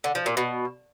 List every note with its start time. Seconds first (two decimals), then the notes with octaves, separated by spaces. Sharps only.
0.04 D3
0.15 F3
0.26 A#2
0.37 B2